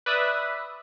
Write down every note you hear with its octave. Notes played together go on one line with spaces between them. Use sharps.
B4 D5 E5 D#6 F#6